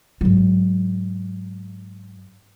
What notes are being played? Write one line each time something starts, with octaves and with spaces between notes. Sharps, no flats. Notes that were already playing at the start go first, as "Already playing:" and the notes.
G#2 F#3